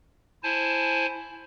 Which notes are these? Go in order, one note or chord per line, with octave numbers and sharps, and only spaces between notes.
E4 C5 G#5 A5